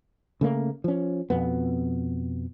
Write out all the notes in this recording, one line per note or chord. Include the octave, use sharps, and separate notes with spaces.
C#3 A3 A#3
F3 C#4
F2 B2 B3